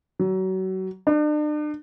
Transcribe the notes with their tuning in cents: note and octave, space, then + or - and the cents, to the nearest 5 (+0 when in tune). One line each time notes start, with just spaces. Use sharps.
F#3 +30
D4 +40